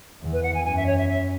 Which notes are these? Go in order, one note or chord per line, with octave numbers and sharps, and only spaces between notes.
E2
B4
F#5
G#5
F#2 G#5
E5
C#5
E5
E5